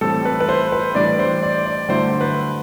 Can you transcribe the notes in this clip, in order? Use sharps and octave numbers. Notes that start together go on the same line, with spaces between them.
A2 E3 G3 C4 A4
B4
B4
C5
B4
A2 E3 G3 D4 D5
C5
D5
D5
G2 D3 F#3 A3 E4 C5
B4